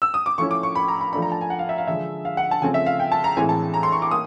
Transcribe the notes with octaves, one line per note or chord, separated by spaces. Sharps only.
E6
D#6
D6
F3 A3 C#4 E4 C#6
D6
C#6
B5
A#5
B5
F3 A3 D4 B5
A#5
A5
G#5
F#5
F5
E5
F5
D3 F3 G#3 E5
F5
F#5
A5
C#3 F3 A3 C4 G#5
E5
F5
G5
A5
A#5
A2 E3 G#3 C4 E4 G#5
A5
A#5
C6
C#6
D6
A#3 D#6